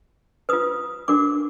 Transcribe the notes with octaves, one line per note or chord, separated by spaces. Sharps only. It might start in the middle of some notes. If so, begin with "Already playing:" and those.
F4 B4 D#6
D4 F#4 A#4 D6